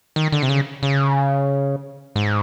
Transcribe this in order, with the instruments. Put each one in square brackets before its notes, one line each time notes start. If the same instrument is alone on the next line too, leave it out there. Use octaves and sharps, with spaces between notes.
[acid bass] D#3
D3
C3
C#3
C#3
G#2